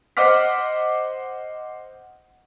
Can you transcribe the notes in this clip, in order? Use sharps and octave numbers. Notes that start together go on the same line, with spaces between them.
C5 D#5 F#5 D6 F6 B6